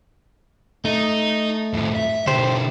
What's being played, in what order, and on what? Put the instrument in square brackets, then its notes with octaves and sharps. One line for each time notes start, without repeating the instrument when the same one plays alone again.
[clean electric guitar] A3 [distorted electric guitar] D#4
[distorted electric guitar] F2 A2
E5
[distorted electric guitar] B2 D3 [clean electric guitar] G4 C5